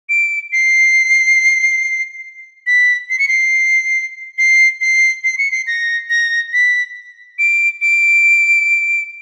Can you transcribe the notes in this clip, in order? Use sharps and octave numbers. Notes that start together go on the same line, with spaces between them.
D7
C7
B6
C7
C#7
C7
C7
C7
C7
C#7
C7
A#6
A#6
B6
D7
D7